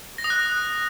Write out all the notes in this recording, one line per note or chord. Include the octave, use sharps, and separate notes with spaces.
A#6
D#6
F#6